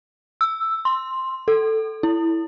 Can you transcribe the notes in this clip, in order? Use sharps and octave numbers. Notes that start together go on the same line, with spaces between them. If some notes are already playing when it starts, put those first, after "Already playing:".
E6
C6
A4
E4